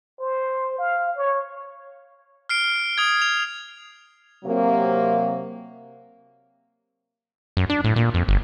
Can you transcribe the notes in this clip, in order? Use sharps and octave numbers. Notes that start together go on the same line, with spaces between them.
C5
F5
C#5
F6 C7 D7
D#6 G#6
F7
C3 F#3 A#3
F#2
D4
A2
A#2
F2
G1